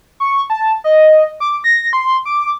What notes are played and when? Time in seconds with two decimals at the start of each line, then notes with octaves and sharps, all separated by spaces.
0.20 C#6
0.50 A5
0.84 D#5
1.40 D6
1.64 A#6
1.93 C6
2.26 D6